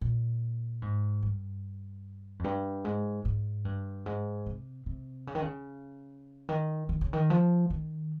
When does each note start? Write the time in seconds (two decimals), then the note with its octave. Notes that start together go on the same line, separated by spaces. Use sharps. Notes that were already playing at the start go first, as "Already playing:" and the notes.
0.01 A#2
0.82 G#2
1.22 G2
2.39 F2
2.44 G2
2.85 G#2
3.25 G#2
3.65 G2
4.06 G#2
4.46 C3
4.86 C3
5.27 C#3
5.35 D#3
5.42 C#3
6.49 D#3
6.89 D#3
7.01 C#3
7.13 D#3
7.30 F3
7.70 D#3